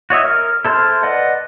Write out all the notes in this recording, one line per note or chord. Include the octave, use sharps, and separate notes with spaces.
F#4 C#5 D#5 E5
A#4 F6
E4 A4 C5 C6 F6
B4 D5 D#5 F#5